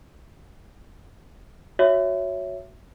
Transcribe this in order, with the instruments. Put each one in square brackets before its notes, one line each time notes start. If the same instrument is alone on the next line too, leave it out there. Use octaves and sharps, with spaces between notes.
[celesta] F#4 C#5 E5